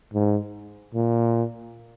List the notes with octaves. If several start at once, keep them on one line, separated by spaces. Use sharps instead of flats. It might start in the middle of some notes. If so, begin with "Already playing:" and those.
G#2
A#2